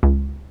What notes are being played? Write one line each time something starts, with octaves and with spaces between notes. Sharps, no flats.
C#2